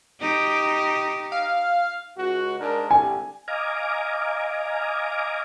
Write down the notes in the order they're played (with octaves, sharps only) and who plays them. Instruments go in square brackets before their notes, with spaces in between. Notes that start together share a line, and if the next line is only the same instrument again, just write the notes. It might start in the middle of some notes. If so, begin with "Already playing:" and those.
[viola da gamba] D#4 G4
[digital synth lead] F5
[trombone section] C#2 F#4
G#2 D4 A#4
[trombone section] C2 D3 G3 [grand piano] G#5
[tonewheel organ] D#5 F5 G#5 A#5 D6